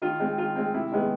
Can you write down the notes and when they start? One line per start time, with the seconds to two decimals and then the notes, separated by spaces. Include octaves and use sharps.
0.02 D#3 F4
0.20 G#3 C4
0.38 D#3 F4
0.56 G#3 C4
0.74 C3 E4
0.92 D#3 G#3 B3